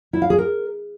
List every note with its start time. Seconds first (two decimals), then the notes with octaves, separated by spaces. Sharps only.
0.13 E4
0.22 F5
0.30 G#4
0.38 A#4